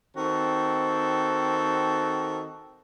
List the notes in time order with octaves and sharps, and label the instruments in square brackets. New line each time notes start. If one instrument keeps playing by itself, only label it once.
[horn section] D#3 C4 F#4 A4